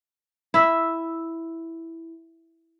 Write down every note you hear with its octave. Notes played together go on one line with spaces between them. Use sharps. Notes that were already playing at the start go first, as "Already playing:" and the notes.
E4 E5